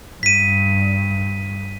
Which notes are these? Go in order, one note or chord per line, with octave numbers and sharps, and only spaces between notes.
G2 B6 D#7